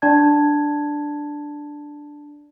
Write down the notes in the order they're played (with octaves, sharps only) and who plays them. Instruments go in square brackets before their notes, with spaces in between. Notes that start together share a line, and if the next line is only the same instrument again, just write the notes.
[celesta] D4 D5 A5 G#6